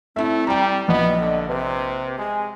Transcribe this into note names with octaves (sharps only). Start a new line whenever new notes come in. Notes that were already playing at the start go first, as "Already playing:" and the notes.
A3 C4 E4 E5
G3 G5 A#5
A#1 B3 D#5
D3
C3 B4
G#3 G#5